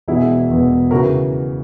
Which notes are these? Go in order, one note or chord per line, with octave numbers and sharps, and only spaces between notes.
E1 E2 B2 E4 G#4
E1 E2 B2
C#3 E3 F#4 A#4